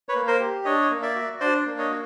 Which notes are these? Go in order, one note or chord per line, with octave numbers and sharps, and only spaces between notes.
B4 C#5
A#3
A#4 C5
G4
D4 C#5 D#5
A#3
D5 E5
F#4
D4 C5 D5
A#3
C#5 D#5
F#4